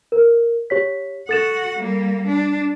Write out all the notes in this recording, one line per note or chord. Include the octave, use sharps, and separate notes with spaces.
A#4
G4 C#5 B6
F#4 A4 F#5 A6 E7
G3 A#3
D4